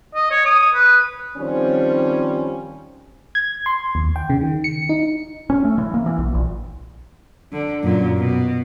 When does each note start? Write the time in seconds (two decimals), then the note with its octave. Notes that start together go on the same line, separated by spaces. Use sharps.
0.15 D#5
0.31 C#5
0.45 D#6
0.74 B4
1.37 D#3 F3 G3 C4 C#4
3.35 G#6
3.66 C6
3.95 D#2
4.16 G5
4.30 C#3
4.41 D#3
4.64 C#7
4.89 D#4
5.50 C#4
5.65 A3
5.78 E3
5.94 A#3
6.06 E3
6.18 B1
6.34 A#1
7.52 D3
7.84 F#2 A#2
8.18 B2